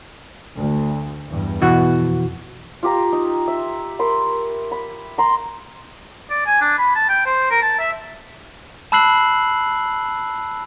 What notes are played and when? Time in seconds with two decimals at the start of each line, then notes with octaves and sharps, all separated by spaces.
0.56 D2
1.29 E2 G2
1.62 B2 E3 F#4
1.92 F2
2.83 F4 G4 A#5
3.12 D#4
3.48 E5
3.99 A#4 B5 C6
4.71 B5
5.18 A#5 C6
6.30 D5
6.46 G#5
6.61 D4
6.78 B5
6.95 A5
7.09 G5
7.26 C5
7.51 A#4
7.62 A5
7.79 E5
8.92 A5 B5 E6 F#6 C7 F#7